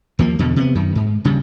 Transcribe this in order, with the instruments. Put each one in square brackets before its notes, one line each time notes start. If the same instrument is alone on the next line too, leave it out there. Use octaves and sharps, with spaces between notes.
[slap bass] D#2 F3 A#3
E2 B2 D3
C3 A#3 B3
F#2 D#3
G#2
D#1 C#3 G3